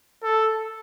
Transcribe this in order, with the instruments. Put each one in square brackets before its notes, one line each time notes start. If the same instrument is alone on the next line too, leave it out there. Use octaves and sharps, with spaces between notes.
[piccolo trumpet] A4